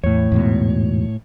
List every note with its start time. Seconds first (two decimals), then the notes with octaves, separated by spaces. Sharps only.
0.04 E2 A2 C#5
0.32 E2 G#2 B2